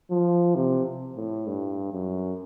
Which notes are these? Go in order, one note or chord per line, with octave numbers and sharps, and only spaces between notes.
F3
C3
A2
G2
F#2